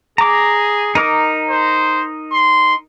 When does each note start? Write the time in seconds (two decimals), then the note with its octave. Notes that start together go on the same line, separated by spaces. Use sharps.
0.18 G#4 A#5 D6
0.95 D#4 A#4 D6
1.49 C5
2.32 C6